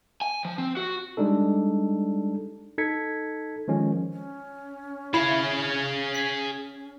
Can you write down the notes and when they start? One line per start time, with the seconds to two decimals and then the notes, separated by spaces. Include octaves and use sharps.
0.21 G#5
0.45 F3
0.58 C4
0.77 F#4
1.17 G3 G#3 D4 D#4 A4
2.78 D#4 A4 G#6 B6 C#7
3.68 D#3 F3 G#3 C#4
4.13 C#4
5.14 E4 G#4 F5
6.14 B6